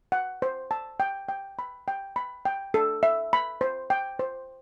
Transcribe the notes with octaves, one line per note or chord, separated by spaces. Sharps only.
F#5
C5
A5
G5
G5
B5
G5
B5
G5
A4
E5
B5
C5
G5
C5